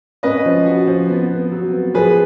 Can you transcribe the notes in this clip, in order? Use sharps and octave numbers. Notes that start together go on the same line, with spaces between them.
C#4 B4 D#5
F3
F#4
F3
B3
B3
F#3
B3
F3 G#4 B4